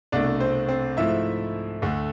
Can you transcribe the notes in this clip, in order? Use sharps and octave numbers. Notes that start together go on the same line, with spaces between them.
C2 B2 A3 D4 D5
C4 C5
C4 C5
G#2 F3 A3 E4 E5
D2 D3 A3